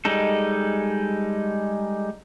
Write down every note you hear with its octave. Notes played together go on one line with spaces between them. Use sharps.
G3 G#3 D#4 A4